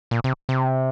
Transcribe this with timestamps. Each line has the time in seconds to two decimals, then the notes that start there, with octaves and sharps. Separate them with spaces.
0.11 A#2
0.24 C3
0.49 C3